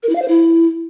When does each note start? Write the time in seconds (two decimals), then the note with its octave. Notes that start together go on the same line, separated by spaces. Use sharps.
0.03 A#4
0.09 E4
0.15 F5
0.22 C5
0.28 E4